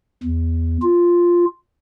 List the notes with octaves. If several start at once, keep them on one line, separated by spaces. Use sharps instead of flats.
E2
F4